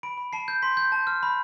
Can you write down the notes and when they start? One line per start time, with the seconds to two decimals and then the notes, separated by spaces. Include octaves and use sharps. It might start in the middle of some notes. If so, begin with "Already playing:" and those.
0.03 B5 D7
0.18 B5
0.33 A5 C7
0.48 G6
0.62 C6 B6
0.77 G6
0.92 A5
1.07 F6
1.23 B5